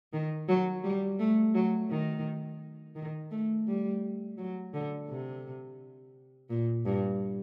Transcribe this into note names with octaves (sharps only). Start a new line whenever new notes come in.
D#3
F#3
G3
A3
F#3
D#3
D#3
A3
G3
F#3
D3
C3
A#2
G2